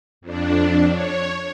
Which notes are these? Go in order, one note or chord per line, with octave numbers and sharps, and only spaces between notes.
F2 D4
C#5